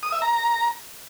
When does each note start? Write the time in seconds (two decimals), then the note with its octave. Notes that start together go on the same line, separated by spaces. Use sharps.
0.03 D#6
0.12 E5
0.22 A#5